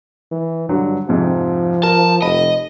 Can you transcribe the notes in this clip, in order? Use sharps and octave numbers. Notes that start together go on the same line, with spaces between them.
E3
G2 D3 F#3
F2 G#2 C3 F3
A#4 A5
F1 D#5 B5